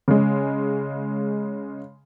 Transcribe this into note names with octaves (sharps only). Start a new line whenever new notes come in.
C#3 G#3